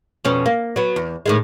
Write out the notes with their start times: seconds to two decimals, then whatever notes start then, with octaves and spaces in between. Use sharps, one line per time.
0.25 F2 B2 C#4
0.46 A#3
0.76 F#3 B3
0.96 E2
1.26 A2 D#3 G#3